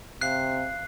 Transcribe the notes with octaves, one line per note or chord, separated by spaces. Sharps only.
C3 F5 F#6 C7